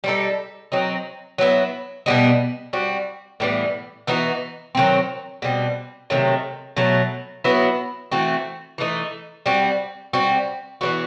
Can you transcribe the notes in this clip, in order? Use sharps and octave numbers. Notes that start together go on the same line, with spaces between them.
G3 C4 D#4 A4
F#3 C4 D#4
F#3 B3 E4
B2 G3 B3 D#4
G3 C4 F#4
A2 E3 G3 B3
E3 B3 D#4 F#4
D#3 F#3 A3 C4
B2 G3 C4
C3 D#3 F#3 A3
B2 F#3 A3
F#3 B3 E4
E3 A3 C4 F#4
E3 A3 D#4
G3 C4 F#4
G3 C4 F#4
E3 G3 B3 F#4